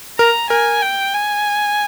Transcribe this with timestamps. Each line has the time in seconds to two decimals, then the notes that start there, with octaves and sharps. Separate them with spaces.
0.19 A#4 A#5
0.50 A#4 G#5
0.82 G5
1.13 G#5